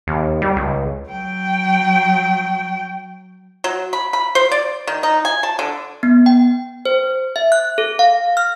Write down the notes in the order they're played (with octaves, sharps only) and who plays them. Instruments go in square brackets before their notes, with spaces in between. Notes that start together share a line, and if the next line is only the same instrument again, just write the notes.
[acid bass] D#2
G3
C#2
[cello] F#3 G5
[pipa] F#3
B5
B5
C5
D5
D#3
D#4
G#5
A5
D3
[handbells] B3
G5
C5
E5
F#6
A4
F5
F6